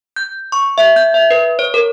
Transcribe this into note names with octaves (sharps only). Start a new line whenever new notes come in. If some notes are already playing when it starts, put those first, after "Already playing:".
G6
C#6
E5
G6
E5
B4
C#5
A#4